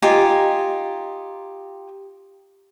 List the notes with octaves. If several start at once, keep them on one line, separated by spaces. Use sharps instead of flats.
D#4 F4 G4 G#5